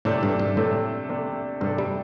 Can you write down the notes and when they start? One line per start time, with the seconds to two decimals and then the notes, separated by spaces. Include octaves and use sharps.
0.05 A2 C3 A3 D4 A4
0.23 G2
0.39 G2
0.57 A2 C3 A3 D4 A4
1.09 C3 A3 D4 A4
1.61 G2 C3 A3 D4 A4
1.78 G3